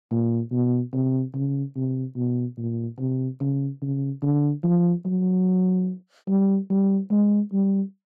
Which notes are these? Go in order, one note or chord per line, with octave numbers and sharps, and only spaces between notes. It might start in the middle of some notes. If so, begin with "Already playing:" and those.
A#2
B2
C3
C#3
C3
B2
A#2
C3
C#3
C#3
D3
F3
F#3
G3
G3
G#3
G3